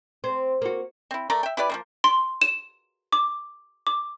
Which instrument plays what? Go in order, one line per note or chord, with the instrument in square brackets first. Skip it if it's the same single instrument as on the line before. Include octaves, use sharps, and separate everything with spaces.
[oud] C4
A#3 F#4
[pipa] C4 E4
A3 A#4 D5 A#5
E5 G5
E4 G4 B4 D5
F3 G3 A#3
[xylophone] C6
E7
D6
D6